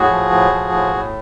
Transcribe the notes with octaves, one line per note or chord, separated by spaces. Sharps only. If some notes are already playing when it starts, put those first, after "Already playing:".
Already playing: A2 F#4 G#4
F3
A2
F3
A2
A2